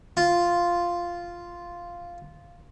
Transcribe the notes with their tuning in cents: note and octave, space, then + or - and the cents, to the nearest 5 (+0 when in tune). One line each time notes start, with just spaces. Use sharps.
F4 -5